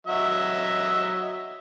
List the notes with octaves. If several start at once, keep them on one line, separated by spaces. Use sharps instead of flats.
F#3 D#5 E5